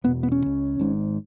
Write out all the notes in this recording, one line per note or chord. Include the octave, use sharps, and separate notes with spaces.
E1 E2 B2 B3
B3
C#4
C#2 C#3
G#1 G#2